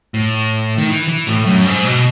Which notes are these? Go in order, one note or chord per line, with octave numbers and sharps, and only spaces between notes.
A2
D#3
E3
E3
A2
F#2
G#2
B2